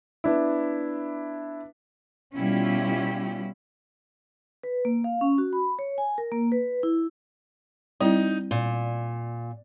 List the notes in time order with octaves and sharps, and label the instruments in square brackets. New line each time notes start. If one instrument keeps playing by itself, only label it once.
[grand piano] B3 D4 E4
[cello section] B2 G3 C#4 E4 F4 G4
[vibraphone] B4
A#3
F5
C#4
F#4
B5
C#5
G#5
A#4
A#3
B4
E4
[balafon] G3 C4 E4 [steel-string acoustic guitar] D#4
[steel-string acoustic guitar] A#2